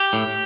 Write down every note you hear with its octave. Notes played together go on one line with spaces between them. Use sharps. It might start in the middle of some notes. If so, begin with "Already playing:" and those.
Already playing: G4
A2